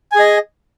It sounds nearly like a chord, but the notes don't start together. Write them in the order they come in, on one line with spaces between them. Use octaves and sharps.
G#5 G#4 D#5